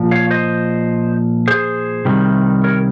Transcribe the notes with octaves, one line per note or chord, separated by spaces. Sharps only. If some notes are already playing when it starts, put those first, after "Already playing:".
Already playing: A#2 F3
C#5 F5
C5 D#5
G#4 C5
C3 D#3 G3
A#4 C#5